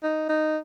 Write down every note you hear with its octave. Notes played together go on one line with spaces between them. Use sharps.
D#4
D#4